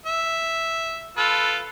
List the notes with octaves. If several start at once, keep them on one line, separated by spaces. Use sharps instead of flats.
E5
F4 A4 B4